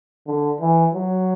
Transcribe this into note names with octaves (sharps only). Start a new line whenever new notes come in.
D3
E3
F#3